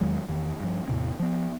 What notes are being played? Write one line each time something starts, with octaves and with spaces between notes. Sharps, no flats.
E2 D#3 F#3 G#3
E2 D#3
G2 F3
E2 A2 C3 C4
F3 B3